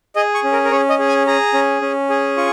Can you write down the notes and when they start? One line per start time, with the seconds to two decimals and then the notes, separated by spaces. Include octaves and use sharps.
0.16 G#4 D#5
0.35 C#6
0.44 C#4
0.52 A#4
0.65 A#4
0.71 C#4 C#5
0.90 D#5
0.99 G#4
1.08 G#5
1.27 G#4 A#5
1.54 C#4
1.81 C#4
2.10 G#4
2.37 F4 C#6